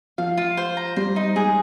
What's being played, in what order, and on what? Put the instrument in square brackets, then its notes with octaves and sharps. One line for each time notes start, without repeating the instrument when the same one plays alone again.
[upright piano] F3 [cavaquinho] F5
[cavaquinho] F4
C5
A#5
[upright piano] G3 [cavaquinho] C5
[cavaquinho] D#4
[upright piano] G#3 [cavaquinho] G#4